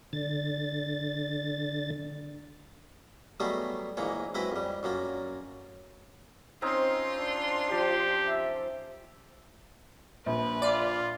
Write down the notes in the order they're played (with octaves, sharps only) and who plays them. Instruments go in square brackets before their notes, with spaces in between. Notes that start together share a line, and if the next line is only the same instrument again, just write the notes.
[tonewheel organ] D3 A6
[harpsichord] F#3 G3 A3 B3 D#4 G#4
A#1 G#2 E3 A#3 C#5
F#3 G#3 C4 E4 B4 D#5
F2 G3
F#2 F#3 A#3 F4
[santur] C4 C#4 D#4 [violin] F4 C6
[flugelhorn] D4
[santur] F3 [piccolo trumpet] G4
[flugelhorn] E5
[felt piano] A#1 [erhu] B4
[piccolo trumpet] F4 [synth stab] D5